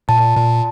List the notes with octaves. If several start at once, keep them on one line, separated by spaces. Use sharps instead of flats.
A#2 A5
A#2